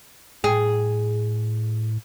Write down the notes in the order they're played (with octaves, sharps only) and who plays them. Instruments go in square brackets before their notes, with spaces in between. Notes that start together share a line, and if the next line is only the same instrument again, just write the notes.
[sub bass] A2 [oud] G#4